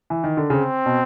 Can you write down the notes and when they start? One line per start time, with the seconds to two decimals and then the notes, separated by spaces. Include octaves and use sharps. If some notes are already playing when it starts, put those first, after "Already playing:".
0.10 E3
0.24 D#3
0.37 D3
0.50 C#3 C4
0.86 B2